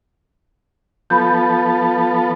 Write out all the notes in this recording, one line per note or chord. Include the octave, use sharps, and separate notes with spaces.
F3 B3 A4 B5 G6